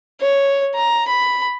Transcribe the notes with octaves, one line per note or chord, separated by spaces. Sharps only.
C#5
A#5
B5